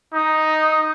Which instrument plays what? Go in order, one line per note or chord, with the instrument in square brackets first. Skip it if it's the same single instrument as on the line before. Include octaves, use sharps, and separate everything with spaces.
[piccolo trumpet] D#4 [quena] D#6